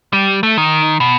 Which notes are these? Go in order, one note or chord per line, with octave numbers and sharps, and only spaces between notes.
G3
A3
D#3
B2